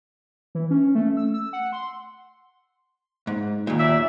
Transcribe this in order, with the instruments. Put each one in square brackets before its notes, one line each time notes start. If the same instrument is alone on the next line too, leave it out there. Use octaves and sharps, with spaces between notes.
[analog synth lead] E3
C#4
A3
E6
E6
F#5
C6
[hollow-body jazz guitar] G#2
D#2 A#2
[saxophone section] F#3 D5 E5